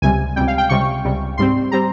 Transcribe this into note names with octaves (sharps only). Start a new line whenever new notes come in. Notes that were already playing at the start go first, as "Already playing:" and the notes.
C#2 C3 G3 G#5
C#2 C3 G3 G5
F5
G5
C#2 C3 G3 C#6
C#2 C3 G3
G#2 G3 C4 C6
G3 C4 A#5